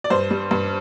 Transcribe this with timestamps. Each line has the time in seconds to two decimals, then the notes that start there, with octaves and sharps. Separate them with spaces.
0.04 D5
0.10 G2 C5
0.31 G3
0.51 G2